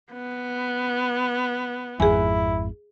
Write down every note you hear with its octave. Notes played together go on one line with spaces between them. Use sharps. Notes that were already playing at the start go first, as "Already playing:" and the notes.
B3
G#1 F2 E4 G#4 G#5